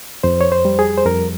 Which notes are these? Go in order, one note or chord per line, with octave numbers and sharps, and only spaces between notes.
F2 C5
C#5
C5
G3
G#4
C5
F2 A#4